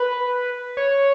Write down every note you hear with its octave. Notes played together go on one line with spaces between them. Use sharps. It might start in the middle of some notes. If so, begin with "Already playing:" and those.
Already playing: B4
C#5